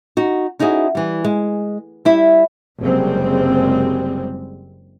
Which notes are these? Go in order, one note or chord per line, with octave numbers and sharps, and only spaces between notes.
D#4 F#4
C#4 D#4 E4 F#4 G#4
E3 G3
G#3
G3 E4 E5
F#1 F#2 C3 G3 G#3 C4